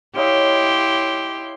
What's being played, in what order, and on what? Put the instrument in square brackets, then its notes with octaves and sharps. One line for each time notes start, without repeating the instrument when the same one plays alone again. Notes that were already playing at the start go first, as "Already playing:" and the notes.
[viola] E4 C6 [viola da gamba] G4 [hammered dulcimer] C#5 D#5 F5